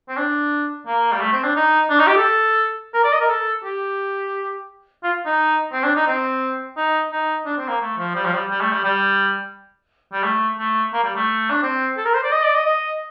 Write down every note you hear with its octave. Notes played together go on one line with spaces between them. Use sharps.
C4
D4
A#3
G3
A3
C4
D4
D#4
D4
D#4
G4
A4
A#4
D5
D#5
A#4
A4
G4
F4
D#4
C4
D4
D#4
C4
D#4
D#4
D4
C4
A#3
A3
F3
G3
F3
G3
G3
A3
G3
G3
G3
A3
A3
A#3
G3
A3
D4
C4
A4
A#4
C5
D5
D#5
D5
D#5
D#5